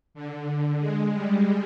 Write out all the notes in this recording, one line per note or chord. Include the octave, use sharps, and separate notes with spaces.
D3
G#3
G3